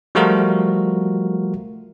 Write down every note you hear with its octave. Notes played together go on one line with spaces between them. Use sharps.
F3 G3 A3 F4 F#4 A#4